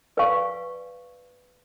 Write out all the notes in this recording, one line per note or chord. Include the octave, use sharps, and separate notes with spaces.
B4 D5 F5 G#5 C#6